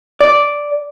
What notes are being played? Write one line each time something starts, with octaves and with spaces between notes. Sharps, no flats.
D5